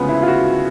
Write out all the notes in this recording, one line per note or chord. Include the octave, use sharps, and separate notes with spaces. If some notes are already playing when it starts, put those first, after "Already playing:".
Already playing: D2 C#3 F3 G#3 B3
E4
F4
F#4